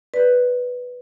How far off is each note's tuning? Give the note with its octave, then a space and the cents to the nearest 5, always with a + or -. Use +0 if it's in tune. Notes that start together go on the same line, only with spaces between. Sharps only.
B4 +0 D5 +0